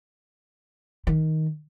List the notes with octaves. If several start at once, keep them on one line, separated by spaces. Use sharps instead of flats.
D#3